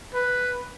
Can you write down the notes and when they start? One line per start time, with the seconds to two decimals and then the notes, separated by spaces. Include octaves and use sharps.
0.14 B4